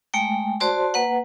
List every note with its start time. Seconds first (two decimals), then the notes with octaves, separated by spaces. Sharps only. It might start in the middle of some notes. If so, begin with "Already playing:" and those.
0.14 G#3 A3 G5
0.60 F#4 C5 D5 A5 C6
0.94 A#3 B4 F#5